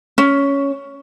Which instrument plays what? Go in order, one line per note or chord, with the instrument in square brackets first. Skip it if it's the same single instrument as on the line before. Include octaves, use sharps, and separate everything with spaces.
[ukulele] C#4